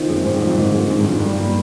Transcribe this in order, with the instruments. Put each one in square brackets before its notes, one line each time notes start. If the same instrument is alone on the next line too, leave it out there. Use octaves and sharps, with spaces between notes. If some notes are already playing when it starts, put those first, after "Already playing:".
Already playing: [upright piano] D#3 C4 F4
[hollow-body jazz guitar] F#2 [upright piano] G#3
[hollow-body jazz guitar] G#2 [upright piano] C4
[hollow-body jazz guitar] G2
[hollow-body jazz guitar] F#2 [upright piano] F4
[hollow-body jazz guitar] G2
[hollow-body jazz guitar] G#2 [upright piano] D#3
[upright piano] G#3
[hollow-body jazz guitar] G#2 [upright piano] D4
[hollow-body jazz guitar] G2
[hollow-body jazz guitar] F#2 [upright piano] F4
[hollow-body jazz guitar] G2 [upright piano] G3
[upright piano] A#3